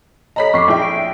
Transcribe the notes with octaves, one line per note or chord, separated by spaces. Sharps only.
A4 C#5 D#5 A#5 B5 B6
F2 C#6 D6 C7
A#1 E4 G#4 G5
D7